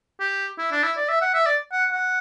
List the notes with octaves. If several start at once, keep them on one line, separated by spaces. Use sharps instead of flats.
G4
E4
D4
E4
D5
E5
F#5
E5
D5
F#5
F#5